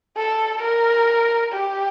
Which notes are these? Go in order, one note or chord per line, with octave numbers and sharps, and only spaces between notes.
A4
A#4
G4